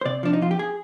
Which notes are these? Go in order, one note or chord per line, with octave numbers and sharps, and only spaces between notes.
C5
C3 D5
F3 D4
D#4
F2 F4
G4
G#4